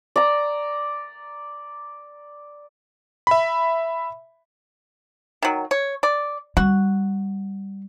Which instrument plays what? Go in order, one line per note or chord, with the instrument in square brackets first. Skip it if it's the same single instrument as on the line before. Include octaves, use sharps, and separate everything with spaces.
[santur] D5 A#5
[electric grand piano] E5 B5
[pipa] D#3 F#3
C#5
D5
[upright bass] G3 [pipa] F#4